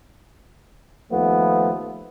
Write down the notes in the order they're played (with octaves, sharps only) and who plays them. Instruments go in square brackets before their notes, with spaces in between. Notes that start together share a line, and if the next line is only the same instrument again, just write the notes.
[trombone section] D#2 F3 A3 B3